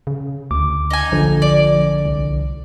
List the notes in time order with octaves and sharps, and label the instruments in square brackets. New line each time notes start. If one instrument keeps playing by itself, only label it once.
[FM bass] C#3
[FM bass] D2 [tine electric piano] D6
[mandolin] D#4 G#5
[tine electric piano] A#1 D3 [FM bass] F3
[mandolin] D5
[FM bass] C2